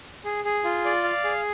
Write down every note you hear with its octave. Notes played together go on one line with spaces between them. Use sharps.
G#4
G#4
F4
D5
F5
G#4